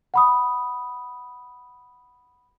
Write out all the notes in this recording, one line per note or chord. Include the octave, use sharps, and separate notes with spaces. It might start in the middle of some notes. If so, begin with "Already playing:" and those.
F#5 B5 D#6